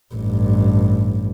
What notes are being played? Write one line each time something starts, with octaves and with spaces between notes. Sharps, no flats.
A1 G2